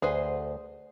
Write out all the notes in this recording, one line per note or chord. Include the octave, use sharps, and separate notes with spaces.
D2 G#4 B4 C5